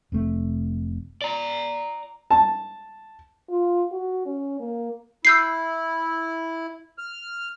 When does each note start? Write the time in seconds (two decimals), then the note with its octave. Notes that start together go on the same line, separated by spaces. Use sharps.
0.12 F1 C3 A3
1.22 D5 A#5
2.31 A5
3.49 F4
3.92 F#4
4.26 C#4
4.59 A#3
5.25 E4 E6 G6 C7
6.98 F6